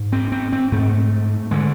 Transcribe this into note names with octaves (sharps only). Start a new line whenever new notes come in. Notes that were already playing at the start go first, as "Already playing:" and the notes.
Already playing: G#2
C4
C4
C4
G#2 A3
D3 G#3